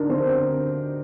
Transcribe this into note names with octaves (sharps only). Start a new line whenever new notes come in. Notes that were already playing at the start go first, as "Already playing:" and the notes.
Already playing: D2 D4 D#4 A#4
D3 C4 C5